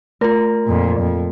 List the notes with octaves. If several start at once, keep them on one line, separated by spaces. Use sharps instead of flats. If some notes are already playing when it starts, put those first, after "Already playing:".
A3 F4 A#4
F2 A#2
F2